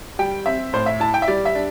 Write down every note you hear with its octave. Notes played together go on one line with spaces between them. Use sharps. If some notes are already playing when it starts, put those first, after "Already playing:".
G3 G5
C4 E5
A2 C5
E5
E4 A5
G5
E5
G3 D5
E5
D4